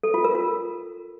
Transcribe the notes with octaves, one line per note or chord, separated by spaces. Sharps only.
A4
F4
A#4
F4